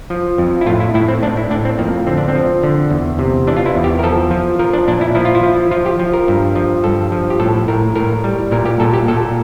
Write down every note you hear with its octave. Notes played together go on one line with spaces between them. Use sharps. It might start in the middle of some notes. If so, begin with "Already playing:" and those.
F3
F2
E4
A2 F4
E4
A2 E4
C4
A2 D4
E4
A2 D4
C4
F2 A#3
D3 C4
D4
C4
F3
D3
E2
C3
E3 D4
F4
E4
E2
G4
A#4
F3 A4
F3
F3 A#4
D4
A#2 D4
E4
F3 E4
F4
E4
F3
F3 F4
G4
F3
A#4
G2
F3
G2 A4
F3
G4
A2 A4
A2 A#4
A2 A#4
G3
A#2 A#4
G4
A#2 A4
G4
A#2 A4